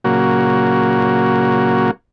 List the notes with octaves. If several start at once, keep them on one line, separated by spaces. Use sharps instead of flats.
A#2 C#3 F#3 A#3 F#4